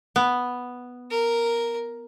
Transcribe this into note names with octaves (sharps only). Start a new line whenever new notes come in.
B3
A#4